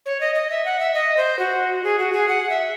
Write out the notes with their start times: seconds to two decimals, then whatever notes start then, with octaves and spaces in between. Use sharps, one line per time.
0.06 C#5
0.21 D#5
0.35 D#5
0.50 E5
0.65 F#5
0.80 E5
0.94 D#5
1.17 C5
1.39 F#4
1.84 G#4
1.99 F#4
2.13 G#4
2.29 F#5
2.50 E5